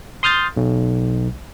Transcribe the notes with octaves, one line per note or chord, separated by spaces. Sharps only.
C6 D#6 F6 G6 A6
B1